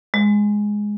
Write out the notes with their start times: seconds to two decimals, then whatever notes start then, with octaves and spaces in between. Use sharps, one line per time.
0.14 G#3